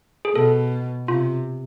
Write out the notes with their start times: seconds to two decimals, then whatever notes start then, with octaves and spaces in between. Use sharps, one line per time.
0.25 G#4
0.35 B2 A4
1.08 C3 F4